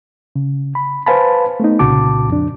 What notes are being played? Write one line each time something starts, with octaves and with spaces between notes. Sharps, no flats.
C#3
B5
B4 C5 F5 G#5 A5 B5
A3 B3 D#4
C2 A#2 C#3 F#4 A5 D6
F2 D4